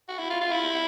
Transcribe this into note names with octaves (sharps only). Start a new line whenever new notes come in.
F#4
E4
F4
F4
E4